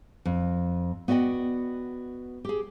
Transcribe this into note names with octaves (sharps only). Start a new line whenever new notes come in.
F2
B3 F#4 D5 D#5 G5
G4 G#4